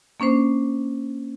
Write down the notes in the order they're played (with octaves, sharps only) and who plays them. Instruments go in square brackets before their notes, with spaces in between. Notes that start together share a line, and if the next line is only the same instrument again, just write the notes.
[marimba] A#3 C#4 D4 C5